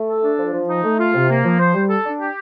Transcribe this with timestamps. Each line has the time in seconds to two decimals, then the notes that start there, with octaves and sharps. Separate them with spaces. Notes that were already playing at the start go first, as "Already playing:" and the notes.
Already playing: A3
0.09 A4
0.23 D4
0.38 F3
0.53 F3
0.69 D#4
0.84 A3
0.99 F4
1.14 C3
1.29 A#3
1.44 F3
1.59 C5
1.75 G3
1.89 A4
2.05 D4
2.20 G4